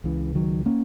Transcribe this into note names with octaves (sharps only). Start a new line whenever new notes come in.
C#2 C#3 E3
D#3 F#3
A#3 C#4